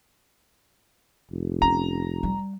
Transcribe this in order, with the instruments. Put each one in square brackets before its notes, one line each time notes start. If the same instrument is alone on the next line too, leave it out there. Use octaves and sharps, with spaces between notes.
[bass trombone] F1
[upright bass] C#4 [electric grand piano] A#5
[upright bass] G3